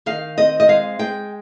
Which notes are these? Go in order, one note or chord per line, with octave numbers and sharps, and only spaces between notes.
D#3 F5
C4 D#5
D#5
G#3 F5
G#3 G5